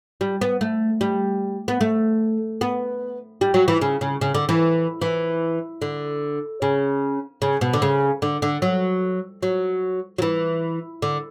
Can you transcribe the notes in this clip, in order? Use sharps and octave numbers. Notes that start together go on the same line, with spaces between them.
G3
B3
A3
G3
B3
A3
B3
G3
F#3
E3
C#3
C#3
C#3
D3
E3
E3
D3
C#3
C#3
B2
D3
C#3
D3
D3
F#3
F#3
F#3
E3
D3